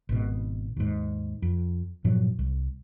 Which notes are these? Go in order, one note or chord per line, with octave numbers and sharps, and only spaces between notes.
G#1 B2
D#2 G#2
F2
G2 A#2 F3 F#3
C2